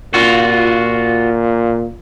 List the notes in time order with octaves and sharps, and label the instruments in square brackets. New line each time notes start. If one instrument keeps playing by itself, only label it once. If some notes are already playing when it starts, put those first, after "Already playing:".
[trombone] A#2 [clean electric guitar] F4 F#4